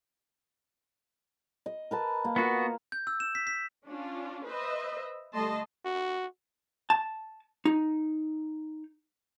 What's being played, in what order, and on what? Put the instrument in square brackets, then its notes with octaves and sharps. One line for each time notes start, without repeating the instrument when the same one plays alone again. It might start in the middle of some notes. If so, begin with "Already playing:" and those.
[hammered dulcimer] D#5
A#4 B4 A5
A#3
[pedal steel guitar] B3 F#4 [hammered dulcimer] F4 A#4
[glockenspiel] G6
E6
E7
B6
B6
[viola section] C#4 D4 F4
B4 C5 D#5 E5
D3 G3 A3 D#5 A5 C6
[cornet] F#4
[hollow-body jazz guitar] A5
D#4